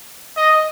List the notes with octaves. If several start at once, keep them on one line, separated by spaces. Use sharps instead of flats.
D#5